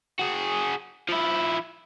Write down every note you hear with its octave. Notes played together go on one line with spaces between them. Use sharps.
F#4 G#4
F3 E4